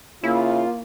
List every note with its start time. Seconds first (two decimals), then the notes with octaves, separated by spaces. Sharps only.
0.24 C#3 A#3 E4 F4